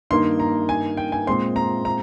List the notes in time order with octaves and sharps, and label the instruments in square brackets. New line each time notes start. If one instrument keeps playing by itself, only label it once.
[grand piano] G2 D#3 A#3 D#4 A#4 [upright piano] C6
[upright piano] A#5
G#5
G5
G#5
[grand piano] A#2 G#3 C4 [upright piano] C6
[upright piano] A#5
A#5